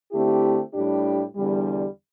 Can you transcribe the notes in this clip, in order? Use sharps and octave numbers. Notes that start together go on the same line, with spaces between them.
D3 A3 C4 E4 G4
A2 G3 D4 G4
E2 D3 G3